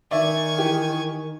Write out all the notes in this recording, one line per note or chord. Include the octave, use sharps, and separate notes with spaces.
D#3 D5 E5 G#5 C#6
E3 G4